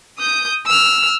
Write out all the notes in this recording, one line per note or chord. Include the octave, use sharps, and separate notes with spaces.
D#6 G6
E6 F6